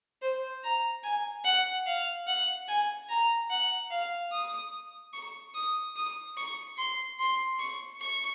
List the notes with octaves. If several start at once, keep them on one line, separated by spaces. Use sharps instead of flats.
C5
A#5
G#5
F#5
F5
F#5
G#5
A#5
F#5
F5
D#6
C#6
D#6
D#6
C#6
C6
C6
C#6
C#6